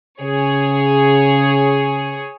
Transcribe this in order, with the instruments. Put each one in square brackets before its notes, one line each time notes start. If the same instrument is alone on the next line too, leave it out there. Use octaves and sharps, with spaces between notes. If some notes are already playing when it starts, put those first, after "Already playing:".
[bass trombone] C#3 [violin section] G#4 C#5